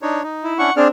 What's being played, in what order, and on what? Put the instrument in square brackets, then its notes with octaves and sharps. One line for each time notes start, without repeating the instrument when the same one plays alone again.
[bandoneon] D4 D#4 C#5
D#4
[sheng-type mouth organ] E4
[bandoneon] C#4 D4 E4 [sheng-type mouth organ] F#5 C#6
[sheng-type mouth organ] C4 D4 [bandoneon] G#4 D5 F6